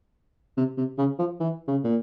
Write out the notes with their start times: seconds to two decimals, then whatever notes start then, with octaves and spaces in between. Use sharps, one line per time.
0.57 C3
0.77 C3
0.98 C#3
1.19 F3
1.40 E3
1.67 C#3
1.84 A#2